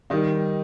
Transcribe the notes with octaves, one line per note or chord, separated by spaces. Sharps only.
D#3 G3 D#4
G3